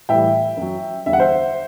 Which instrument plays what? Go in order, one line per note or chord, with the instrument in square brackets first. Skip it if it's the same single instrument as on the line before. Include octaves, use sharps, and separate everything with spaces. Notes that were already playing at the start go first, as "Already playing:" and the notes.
[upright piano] A2 E3 G3 E5 G5
F#2 F#3
E2 D3 G3 E5
F#5
C5 E5